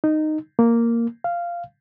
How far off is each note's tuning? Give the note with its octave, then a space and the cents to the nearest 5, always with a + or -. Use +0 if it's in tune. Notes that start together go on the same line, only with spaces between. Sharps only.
D#4 -10
A#3 -5
F5 -10